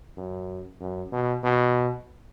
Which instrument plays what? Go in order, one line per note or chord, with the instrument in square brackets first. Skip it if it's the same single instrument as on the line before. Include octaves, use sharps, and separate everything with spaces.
[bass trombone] F#2
F#2
B2
B2